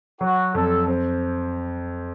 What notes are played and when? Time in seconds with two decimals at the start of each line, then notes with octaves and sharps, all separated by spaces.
0.21 F#3 F#4
0.54 F2 A4
0.88 C4